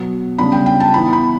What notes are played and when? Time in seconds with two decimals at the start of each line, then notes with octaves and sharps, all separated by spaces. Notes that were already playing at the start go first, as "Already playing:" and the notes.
Already playing: B2 F#3 B3
0.38 C#3 G3 B3 D4 B5
0.52 G5
0.66 G5
0.80 A5
0.94 E3 B3 E4 B5
1.13 B5